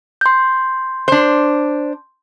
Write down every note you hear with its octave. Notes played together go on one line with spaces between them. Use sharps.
C6 G6
D4 C5